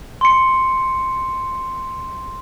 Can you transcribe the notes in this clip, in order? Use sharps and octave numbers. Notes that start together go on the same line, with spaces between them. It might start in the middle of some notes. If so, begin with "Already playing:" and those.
C6 C#7